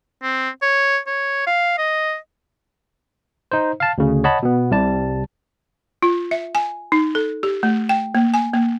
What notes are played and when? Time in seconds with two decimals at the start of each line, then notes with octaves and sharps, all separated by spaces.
0.23 C4
0.62 C#5
1.07 C#5
1.47 F5
1.78 D#5
3.52 D#4 C5
3.80 F5 A5
3.98 D2 C#3
4.24 C#5 D#5 F#5 A5 B5
4.43 B2 B3
4.71 C2 C3 G3 A5
6.03 F4
6.31 E5
6.55 G#5
6.92 D#4
7.15 A4
7.43 G4
7.63 A3
7.89 G5
8.15 A#3
8.34 G#5
8.54 A#3